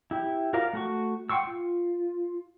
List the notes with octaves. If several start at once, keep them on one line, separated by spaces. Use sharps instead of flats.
E4 G4
F4 F#4 A#4 D5 F5
A3 F#4 C#6
F#5 G5 C6 C#6 E6
F4